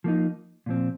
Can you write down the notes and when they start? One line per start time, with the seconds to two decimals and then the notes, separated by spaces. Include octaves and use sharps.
0.04 F3 A#3 D#4
0.66 A#2 F3 C4